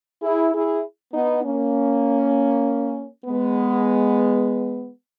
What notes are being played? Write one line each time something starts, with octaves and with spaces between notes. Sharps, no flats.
E4 G#4
E4 G#4
B3 D#4
A#3 C#4
G#3 B3